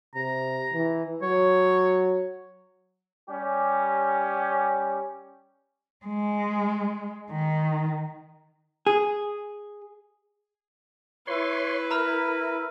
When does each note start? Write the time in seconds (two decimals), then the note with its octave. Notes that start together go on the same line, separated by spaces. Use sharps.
0.15 C3 A#5
0.73 E3
1.22 F#3 C#5
3.29 G3 C#4 G4
6.06 G#3
7.31 D#3
8.87 G#4
11.27 E4 B4 C#5 C6
11.91 A#4 A#5 B5 F6